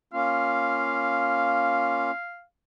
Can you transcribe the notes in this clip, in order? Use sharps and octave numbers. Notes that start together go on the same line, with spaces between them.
A#3 C#4 F4 F5